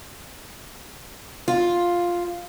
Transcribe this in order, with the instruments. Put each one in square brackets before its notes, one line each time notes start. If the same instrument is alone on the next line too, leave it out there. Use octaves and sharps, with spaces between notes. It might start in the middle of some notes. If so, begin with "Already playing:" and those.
[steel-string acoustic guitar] F4